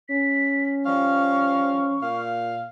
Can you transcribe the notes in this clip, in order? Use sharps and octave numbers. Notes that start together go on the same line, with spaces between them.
C#4 B6
F3 G3 F5 C#6
A#2 F5